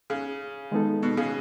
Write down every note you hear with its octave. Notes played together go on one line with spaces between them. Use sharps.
C#3
D#3 G#3 B3 D#4 A4
B2
C#3